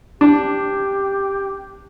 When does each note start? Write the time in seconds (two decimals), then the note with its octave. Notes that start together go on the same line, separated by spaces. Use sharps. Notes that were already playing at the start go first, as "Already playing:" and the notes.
0.20 D4 G4